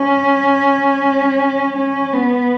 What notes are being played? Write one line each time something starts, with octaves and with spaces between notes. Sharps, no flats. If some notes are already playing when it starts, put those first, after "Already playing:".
Already playing: C#4
C#4
B3